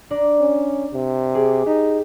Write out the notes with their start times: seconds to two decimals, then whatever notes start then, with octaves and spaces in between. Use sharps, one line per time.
0.10 D4 D5 A#5
0.40 C#4
0.94 C3
1.34 G#4 D6 D#6
1.66 D#4 G4